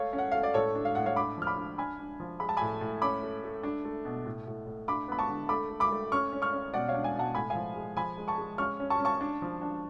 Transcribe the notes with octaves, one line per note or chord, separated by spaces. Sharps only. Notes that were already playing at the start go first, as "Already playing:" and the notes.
Already playing: A3 C#5 F5
C#4
F#5
A3 F5
D5
A2 A4 C#5
D4
F5
A2 F#5
C#5 F5
D4 B5 D6
F3 F6
B5 D6
D4
D4 G#5 B5
D4
F3
G#3 B5
A5
A2 G#5 B5
A2
C#4 B5 D6
A3
A3
D4
A3
B2
A2
A2
A2
D4 B5 D6
B3 B5
A5 C#6
D3
A3 B5 D6
A3
B5 D6
A3
C#4 C#6 F6
C#4
C#6 F6
C#4
B2 D5 F#5
C#5 F5
D4
F5 G#5
B2 F#5 A5
A2 G#5 B5
F5 G#5
F3
G#3
F3 G#5 B5
G#3
A5 C#6
G#3
C#4 C#6 F6
C#4
A5 C#6
C#4
A5 C#6
D4
F3
D4